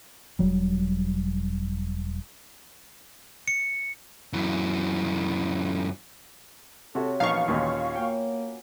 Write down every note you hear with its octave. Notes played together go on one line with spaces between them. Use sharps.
E1 F#3 G3
C#7
F#2 E3
C3 F#4 A4 C#5
A#1 E3 B3 C#4 D#4 F#4 F5 C#6
D#2 A#2 D#3 C#4 F4 G5
A#3 C#4 F#4 G5